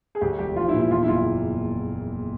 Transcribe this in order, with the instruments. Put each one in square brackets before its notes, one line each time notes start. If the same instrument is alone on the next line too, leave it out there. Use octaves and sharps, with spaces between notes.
[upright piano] G#4
[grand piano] D2 [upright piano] G4
[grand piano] E1 [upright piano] G4
[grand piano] F3 [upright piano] F4
[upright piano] E4
[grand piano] A#2
[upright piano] E4
[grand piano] E2 [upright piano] F4
[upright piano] E4
[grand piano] F#1 [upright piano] F4